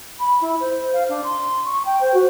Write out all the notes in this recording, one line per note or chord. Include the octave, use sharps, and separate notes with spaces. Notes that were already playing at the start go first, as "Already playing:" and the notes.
B5
E4
C5
F5
D4
C6
C#6
G5
C5
F#4